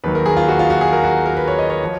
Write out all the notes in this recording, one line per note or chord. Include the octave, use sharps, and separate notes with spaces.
D#2 D#3 F#3 B4
A#4
G#4
F4
F#4
F4
F#4
G#4
A#4
F#4
A#4
B4
C#5
D#5
C#5
F3